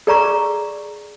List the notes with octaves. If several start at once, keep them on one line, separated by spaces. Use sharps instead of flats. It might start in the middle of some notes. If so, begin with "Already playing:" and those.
G#4 D5 A#5 C#6